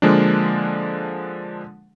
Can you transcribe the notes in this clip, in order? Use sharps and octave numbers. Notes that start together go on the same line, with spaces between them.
D3 F3 G#3 A#3 D4